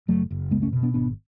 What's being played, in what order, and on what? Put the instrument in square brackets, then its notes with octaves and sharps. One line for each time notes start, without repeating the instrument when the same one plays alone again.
[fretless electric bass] F#1 F#3 A3
F#1
C#2 G#3 B3
A3 C#4
B2
B3 D4
G#1 B3 D4